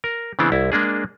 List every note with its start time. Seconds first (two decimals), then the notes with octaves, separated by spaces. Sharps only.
0.04 A#4
0.39 C#3 E3 B3 C4 D4 E4
0.52 C2 E4
0.72 G#3 A#3 D4 G#4